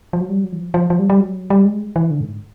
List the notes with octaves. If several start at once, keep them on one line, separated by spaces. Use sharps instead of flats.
F3
F#3
G3
F#3
E3
F3
F3
F3
G3
G3
F#3
G3
G#3
E3
D3
G#2